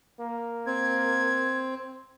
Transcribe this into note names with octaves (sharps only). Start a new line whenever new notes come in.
A#3
C4 G#6